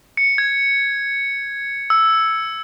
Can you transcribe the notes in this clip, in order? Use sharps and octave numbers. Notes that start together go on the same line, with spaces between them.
C#7
G#6
E6